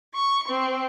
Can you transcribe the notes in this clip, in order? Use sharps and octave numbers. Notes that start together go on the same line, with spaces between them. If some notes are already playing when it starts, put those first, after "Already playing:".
C#6
C4